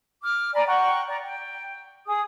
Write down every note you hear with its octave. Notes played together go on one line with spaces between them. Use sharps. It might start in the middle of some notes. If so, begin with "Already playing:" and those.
D6 F6
D5 G#5 A#5 B5
F#5 G5 A#5 C#6
D5 A#5
G5
G#4 D#6